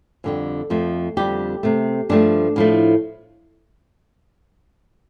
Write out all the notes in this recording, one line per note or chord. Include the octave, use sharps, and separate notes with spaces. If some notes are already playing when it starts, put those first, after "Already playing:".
F2 D3 G3
F2 F3 A3
F2 D3 G3 G4
C3 A3
G2 F3 A3 D4
A2 F3 A3